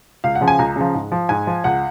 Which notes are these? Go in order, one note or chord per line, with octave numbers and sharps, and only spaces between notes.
C#2 F5
F#5
C#3 F3
G#5
C#2 A#5
C#3 F3
G#2
F3
G#2 G#5
F3
C#2 F#5